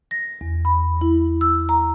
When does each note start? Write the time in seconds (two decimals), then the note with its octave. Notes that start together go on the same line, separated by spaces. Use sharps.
0.11 A#6
0.41 E2
0.65 B5
1.01 E4
1.41 E6
1.69 A#5